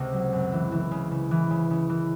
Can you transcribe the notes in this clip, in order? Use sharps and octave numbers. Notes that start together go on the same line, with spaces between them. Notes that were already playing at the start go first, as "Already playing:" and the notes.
Already playing: C#2 C3
F#3
F#2
E3
E3
C#3
C#3
E3
C#3
C#3
E3